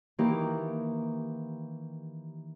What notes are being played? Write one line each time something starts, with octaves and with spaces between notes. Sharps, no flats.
D#3 E3 A#3 D#4 E4 G4